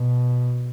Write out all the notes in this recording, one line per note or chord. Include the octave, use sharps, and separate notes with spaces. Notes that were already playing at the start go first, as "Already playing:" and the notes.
Already playing: B2